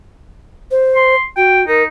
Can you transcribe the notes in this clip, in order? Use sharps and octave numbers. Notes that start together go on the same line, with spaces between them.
C5
C6
F#4 G5
D#4 A#4